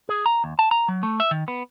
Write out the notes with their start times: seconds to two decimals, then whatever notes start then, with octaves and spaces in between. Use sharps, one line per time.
0.09 G#4
0.26 A#5
0.44 D#2
0.59 A5
0.71 A#5
0.88 F#3
1.03 A3
1.20 E5
1.31 D#3
1.48 B3